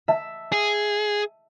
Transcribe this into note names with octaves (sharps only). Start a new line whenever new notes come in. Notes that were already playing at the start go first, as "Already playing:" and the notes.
E5 A5
G#4